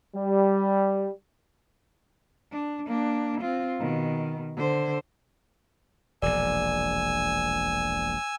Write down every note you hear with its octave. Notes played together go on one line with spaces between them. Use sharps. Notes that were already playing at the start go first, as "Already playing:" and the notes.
G3
D4
A#3 D4
C4 F4
B2 D#3
D3 C5
E1 A#1 D5 G#5 E6